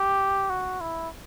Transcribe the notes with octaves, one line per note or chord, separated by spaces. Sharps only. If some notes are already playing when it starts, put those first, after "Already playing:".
Already playing: G4
F#4
E4